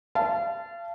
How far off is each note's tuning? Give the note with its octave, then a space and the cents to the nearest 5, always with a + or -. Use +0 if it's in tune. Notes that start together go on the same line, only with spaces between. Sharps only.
F5 -35 A5 -10